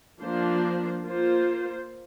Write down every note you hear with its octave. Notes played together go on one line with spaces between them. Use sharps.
F3 A#3 D4 F4 C5
A#3 F4 C5